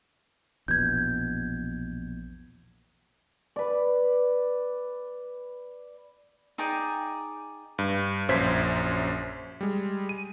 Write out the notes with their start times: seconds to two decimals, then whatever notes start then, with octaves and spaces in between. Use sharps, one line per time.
0.68 A#1 E2 B2 G6 G#6
3.56 B4 D5
6.58 D#4 G#4 D5 G5
7.79 G2
8.29 A#1 F#2 C5 C#5 G#6 B6
9.61 G3 G#3
10.09 D#7